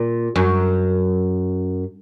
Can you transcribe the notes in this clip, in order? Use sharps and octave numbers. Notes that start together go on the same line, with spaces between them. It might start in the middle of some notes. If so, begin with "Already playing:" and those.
Already playing: A#2
F#2